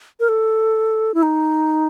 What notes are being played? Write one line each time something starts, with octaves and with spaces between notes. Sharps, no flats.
A#4
A4
E4
D#4